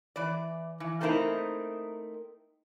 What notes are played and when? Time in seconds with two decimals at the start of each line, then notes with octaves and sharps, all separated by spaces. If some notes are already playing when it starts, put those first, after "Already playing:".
0.16 E3 D5
0.80 E3
1.01 A3 A#3 C4 D#4 E4 A#4